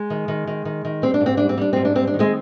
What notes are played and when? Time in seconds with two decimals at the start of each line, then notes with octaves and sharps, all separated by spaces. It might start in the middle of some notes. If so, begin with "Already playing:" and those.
Already playing: G#3
0.10 D#3
0.28 D#3
0.47 D#3
0.65 D#3
0.85 D#3
1.02 G3 C4
1.14 D4
1.20 G#2
1.26 C4
1.37 G3 D4
1.49 C4
1.57 G3 D4
1.73 G#2 C4
1.85 D4
1.95 G3 C4
2.07 D4
2.14 D#3
2.19 G#3 C4